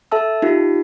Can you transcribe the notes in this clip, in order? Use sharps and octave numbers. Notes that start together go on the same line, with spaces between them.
A4 E5 A5 E6
D#4 F4 G4